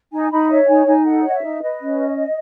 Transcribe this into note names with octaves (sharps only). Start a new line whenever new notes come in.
D#4 G#5
D#4 B5
C#5 E5
D#4 G#5
D#4 G#5
A4 F#5
C#5 D#5
E5
D#4
B4 D#5
C#4